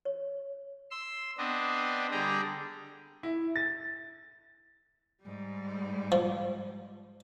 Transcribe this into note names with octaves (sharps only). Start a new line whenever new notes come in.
C#5
C6 E6
B3 C4 D4 D#5
D3 G3 G#4 G5 A#5
E4
A6
G#2 G3
F3